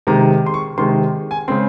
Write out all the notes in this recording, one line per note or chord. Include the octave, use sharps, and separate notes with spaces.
C3 D#3 G#3 A#5
C6
C#6
C3 D#3 G#3 C6
G#5
C#3 G#3 C4 C6